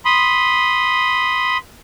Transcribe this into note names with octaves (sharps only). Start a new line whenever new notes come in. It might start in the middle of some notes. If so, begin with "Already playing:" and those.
B5 C6 D#6